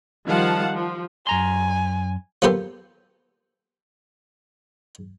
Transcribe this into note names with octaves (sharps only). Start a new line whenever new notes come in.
D#3 F3 G3 F5 F#5 A5
F3
F#2 G#5 A#5 C6
F3 A#3 B3 G4 A4 C5